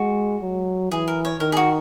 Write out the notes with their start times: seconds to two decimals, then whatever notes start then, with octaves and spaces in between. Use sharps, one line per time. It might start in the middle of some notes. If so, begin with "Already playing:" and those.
Already playing: G#3 F#4
0.42 F#3
0.91 E3 G#4
1.08 A#4
1.25 C#5
1.40 D#3 A#4
1.52 G#4
1.57 F#4